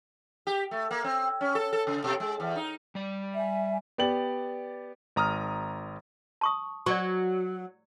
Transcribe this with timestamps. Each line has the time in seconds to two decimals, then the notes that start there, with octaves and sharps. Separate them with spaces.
0.47 G4
0.71 A3
0.91 A#3
1.04 C4
1.41 C#4
1.55 A4
1.73 A4
1.87 C#3
2.04 B2
2.20 G#3
2.40 E2
2.56 D#4
2.95 G3 D5
3.35 E5 G#5
3.98 B3 G4 D5 F#7
5.16 G#1 A#5 D#6 F6
6.41 A5 C#6 D#6
6.86 F#3 D5 C#6